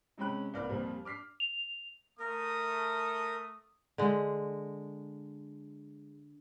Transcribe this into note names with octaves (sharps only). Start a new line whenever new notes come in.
C3 G#3 C#4 G5 B5 F#6
C2 A#3 B4 D5 F6
F2 A#2 F3 G3
D6 F6 B6 C7
F7
A3 A#4 D#6
D3 G#3